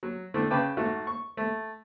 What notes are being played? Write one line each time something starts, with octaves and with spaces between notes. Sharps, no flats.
F#3
D3 A3 C4 E4
C#3 B4 G5 A5 D6
G#2 A3 F#4
C#6
A3